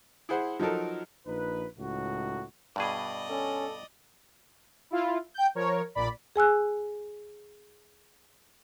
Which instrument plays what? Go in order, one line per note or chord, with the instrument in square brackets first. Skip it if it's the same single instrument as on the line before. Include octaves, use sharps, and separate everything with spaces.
[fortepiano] E4 G#4 C5 F#5
F3 F#3 D#4 A4 A#4
[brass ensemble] A#1 D#4 B4
C#2 A2 D#4 F#4
[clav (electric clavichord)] G2 B2 G#4 [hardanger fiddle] D5 D#5
[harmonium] C#4 [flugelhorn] A4
[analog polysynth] E4 F4
G5 G6
F3 A#4 C#5
A#1 A#2 D5 B5
[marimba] G#4 G#5 E6 F#6